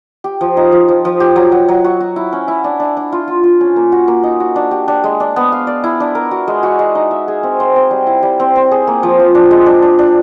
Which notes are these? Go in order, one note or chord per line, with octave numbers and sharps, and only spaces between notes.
G4
F3
D#4
F3
F3
F3
G4
F#3
F#3
F#3
F#4
F#4
E4
C#4
E4
D4
D4
D4
F4
F4
F4
C#4
A#3
F#4
A#3
D#4
F#4
D4
G4
D4
G#3
D4
B3
F5
D5
E4
D4
A#4
F#4
G#3
F#4
G#3
D#4
E5
G#4
C4
C5
C4
G3
E4
G3
C4
C4
G#4
A#3
F3
F3
D4
G#3
D4
D4
D4